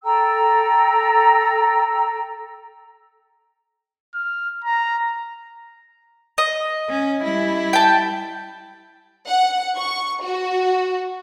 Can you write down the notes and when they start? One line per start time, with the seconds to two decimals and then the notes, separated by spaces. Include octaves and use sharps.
0.04 A4 G5 A#5 E6
4.15 F6
4.65 A#5
6.38 D#5
6.89 C#4
7.23 G3 E4
7.73 G5 A5
9.28 F#5
9.77 C#6
10.23 F#4